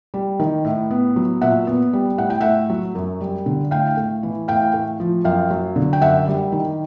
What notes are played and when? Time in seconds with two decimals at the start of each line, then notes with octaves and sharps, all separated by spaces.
0.14 G3
0.39 D#3
0.65 A2
0.91 B3
1.16 F#3
1.41 A#2 E5 F#5
1.67 B3
1.93 G3
2.18 A2 F#5
2.30 G5
2.41 A3 E5 F#5
2.70 F#3
2.95 F#2
3.20 G3
3.46 D3
3.71 A2 F5 G5
3.97 A3
4.23 E3
4.48 A2 F5 G5
4.74 A3
5.00 F3
5.25 F#2 F5 G5
5.51 F#3
5.76 D3
5.93 G5
6.01 F#2 E5 F#5
6.27 G3
6.52 D#3